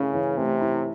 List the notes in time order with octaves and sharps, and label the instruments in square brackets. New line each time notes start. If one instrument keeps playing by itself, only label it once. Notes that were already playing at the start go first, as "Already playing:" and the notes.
Already playing: [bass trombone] C#3 [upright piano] A3 C#4 E4
[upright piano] E3
[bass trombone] C3 [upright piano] A3
[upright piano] E4